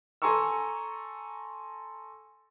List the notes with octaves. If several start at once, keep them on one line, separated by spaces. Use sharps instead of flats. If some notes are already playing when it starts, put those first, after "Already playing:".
A4 G#5 A#5 C6 C#6 E6